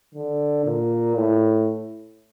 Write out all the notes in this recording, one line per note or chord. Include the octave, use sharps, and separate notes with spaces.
D3
A#2
A2